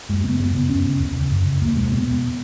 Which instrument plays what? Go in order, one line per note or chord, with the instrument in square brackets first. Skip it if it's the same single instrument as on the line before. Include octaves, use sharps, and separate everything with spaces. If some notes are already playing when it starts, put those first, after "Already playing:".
[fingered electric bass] F#2 G#3
C#3 B3
F#2 B3
C#3
F#2 C#4
C#3
E2
C#3
F#2
C#3
E2 A#3
B2 G#3
E2 B3
B2